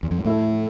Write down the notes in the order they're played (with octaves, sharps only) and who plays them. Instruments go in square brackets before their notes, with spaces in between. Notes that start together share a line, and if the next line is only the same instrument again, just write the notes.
[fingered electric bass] E2
F2
G#2
[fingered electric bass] A2 [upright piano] A3 E4 A4